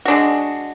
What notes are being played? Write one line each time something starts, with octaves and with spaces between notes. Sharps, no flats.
G#3 D4 F#4